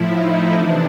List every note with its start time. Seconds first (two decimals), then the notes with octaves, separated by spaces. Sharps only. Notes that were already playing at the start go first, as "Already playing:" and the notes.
Already playing: A2 F3 E4
0.12 D#4
0.51 C3 E3 D4